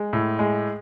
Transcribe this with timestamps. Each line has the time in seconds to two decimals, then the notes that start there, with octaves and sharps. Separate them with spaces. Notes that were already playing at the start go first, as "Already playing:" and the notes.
Already playing: G#3
0.13 A2
0.39 G#3